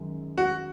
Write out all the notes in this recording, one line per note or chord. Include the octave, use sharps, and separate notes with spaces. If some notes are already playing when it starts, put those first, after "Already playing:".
Already playing: F#2 D#3 G#3
F#4